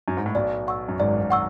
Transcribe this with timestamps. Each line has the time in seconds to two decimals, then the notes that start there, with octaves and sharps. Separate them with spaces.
0.08 F#2
0.17 G#2
0.26 A2
0.35 B1 B2 D5
0.67 F#5 C#6 E6
0.88 F#2
0.99 G#1 G#2 D5
1.21 G#1 G#2
1.31 F#5 C#6 E6